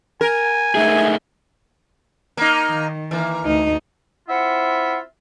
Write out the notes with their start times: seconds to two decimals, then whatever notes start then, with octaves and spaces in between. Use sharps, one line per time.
0.21 A#4 G#5
0.75 A3 D#4 G#4 E5
2.37 A#3 D#4
2.69 D#3
3.11 E3 A#3
3.45 D2 D#4
4.28 C4 E4 F4 E5 F#5